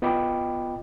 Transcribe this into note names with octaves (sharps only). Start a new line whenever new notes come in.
B3 F4 D#5 G5 B5 D6